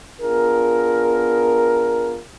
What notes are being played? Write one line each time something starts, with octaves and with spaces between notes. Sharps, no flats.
B3 D4 F4 G#4 A#4